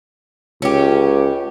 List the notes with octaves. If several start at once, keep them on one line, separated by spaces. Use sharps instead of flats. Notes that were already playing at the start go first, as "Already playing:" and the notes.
C#2 C#4 G4